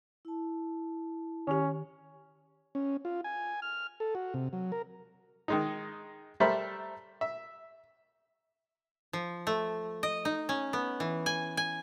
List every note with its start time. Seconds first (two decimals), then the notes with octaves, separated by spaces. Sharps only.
0.25 E4 A5
1.48 D#3 C#4 G4
2.75 C#4
3.05 F4
3.24 G#5
3.62 F6
4.00 A4
4.15 F#4
4.34 C3
4.53 F#3
4.72 A#4
5.48 D#3 G#3 D#4
6.40 G3 A3 A#4 C5 E5 B5
7.21 E5
9.13 F3
9.47 A3
10.03 D#5
10.25 D#4
10.49 C#4
10.73 B3
11.00 E3
11.26 G#5
11.57 G#5